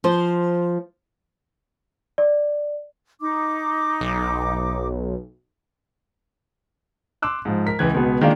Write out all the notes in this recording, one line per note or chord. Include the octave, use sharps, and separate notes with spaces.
F3 C5
D5
D#4 D6
B1
C6 D6 E6 F#6
G#2 F3
A#4 B6
C#2 E3 G#6
C#2 B2 B3
D#3 G#3 A#3 D4 F4